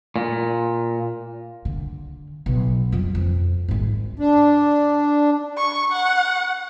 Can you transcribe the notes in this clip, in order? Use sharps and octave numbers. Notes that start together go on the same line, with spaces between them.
A#2
D3
B1
F2 F3
F2
G#1 G#3
D4
C#6
F#5